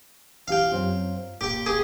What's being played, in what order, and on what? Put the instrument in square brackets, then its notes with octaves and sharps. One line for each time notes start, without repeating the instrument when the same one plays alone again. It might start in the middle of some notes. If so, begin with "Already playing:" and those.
[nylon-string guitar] E3 G4 [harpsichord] F5 G5
[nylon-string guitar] F#2 C4 F4
[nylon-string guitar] A#2 [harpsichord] G4 G5
[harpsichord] G4 G#4